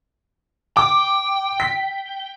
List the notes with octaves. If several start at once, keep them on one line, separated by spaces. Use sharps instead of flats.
G5 D6
B6